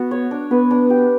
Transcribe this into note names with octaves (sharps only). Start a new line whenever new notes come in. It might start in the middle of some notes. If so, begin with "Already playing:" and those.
Already playing: B3 F#4
C#5
D4
B3 B4
D4
G4